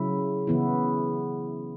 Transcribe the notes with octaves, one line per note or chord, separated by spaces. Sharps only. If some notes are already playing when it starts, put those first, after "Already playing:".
Already playing: C#3 F#3 E4
C#3 E3 B3 E4